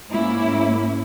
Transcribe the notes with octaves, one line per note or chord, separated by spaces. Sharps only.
G#2 A#3 C#4 E4